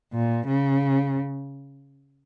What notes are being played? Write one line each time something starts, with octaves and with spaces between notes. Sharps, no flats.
A#2
C#3